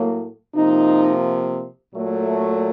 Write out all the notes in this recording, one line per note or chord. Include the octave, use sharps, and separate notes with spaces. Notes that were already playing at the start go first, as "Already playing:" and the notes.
Already playing: A2 F#3 A#3
C3 F3 A#3 D#4
A#2 F#3 A3